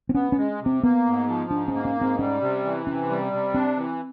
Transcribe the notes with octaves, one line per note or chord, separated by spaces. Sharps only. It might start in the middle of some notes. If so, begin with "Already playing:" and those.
C4
B3 C#4
C#4
G#3
C3
C4
A#3 B3
G#2
F3
G#2 D4
C#4
A#3
C#4
G#2
C4
G3 C#4
C3
E3
C3 C#4
G3
C3
C4 D4
E3